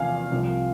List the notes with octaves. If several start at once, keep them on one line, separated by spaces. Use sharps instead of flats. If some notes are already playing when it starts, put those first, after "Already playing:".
Already playing: E2 C3 F3 F5 G#5
C2 C3 F3